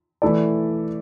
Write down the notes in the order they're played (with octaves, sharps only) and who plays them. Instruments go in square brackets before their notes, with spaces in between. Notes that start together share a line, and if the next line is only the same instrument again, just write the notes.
[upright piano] E3 A3 E4 A4 D5